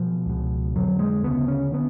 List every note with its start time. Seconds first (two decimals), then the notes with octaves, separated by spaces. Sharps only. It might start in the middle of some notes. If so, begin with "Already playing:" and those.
Already playing: B2 F3
0.26 C#2 B2
0.75 F2 D3 F#3
0.99 G#3
1.23 D2 C#3 B3
1.48 C#4
1.72 D3 B3